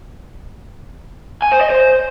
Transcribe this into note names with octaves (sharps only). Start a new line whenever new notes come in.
G#5
C5
D#5
C5